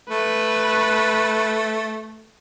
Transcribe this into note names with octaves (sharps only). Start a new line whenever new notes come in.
A3 B4